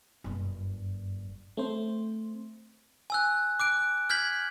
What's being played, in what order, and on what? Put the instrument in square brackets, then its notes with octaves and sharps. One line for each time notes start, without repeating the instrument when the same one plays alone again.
[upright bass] F#1 G2
[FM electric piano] A3 C4 C5
[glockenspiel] G#5 E6 F#6
D6 F#6 D7
F6 G6 G#6 B6 F#7